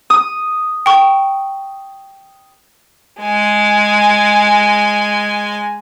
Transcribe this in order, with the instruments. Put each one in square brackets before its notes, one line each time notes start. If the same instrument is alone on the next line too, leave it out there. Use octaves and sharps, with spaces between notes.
[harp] D#6
[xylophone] G5 C#6
[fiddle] G#3 G#5